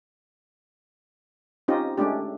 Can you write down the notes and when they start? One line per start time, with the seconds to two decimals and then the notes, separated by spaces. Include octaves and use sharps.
1.68 C4 C#4 D#4 F4 G4 D#5
1.98 G#3 A3 C#4 D4 G4